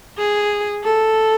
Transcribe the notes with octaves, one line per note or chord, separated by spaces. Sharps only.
G#4
A4